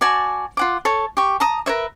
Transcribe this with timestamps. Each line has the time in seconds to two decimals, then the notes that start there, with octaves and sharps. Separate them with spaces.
0.01 F#4 D5 G#5 A5
0.57 F4 F#5 D6
0.85 A4 C#5 A5
1.17 G4 C#6
1.40 A5 A#5 D#6
1.66 A#4 B4 C#5 E5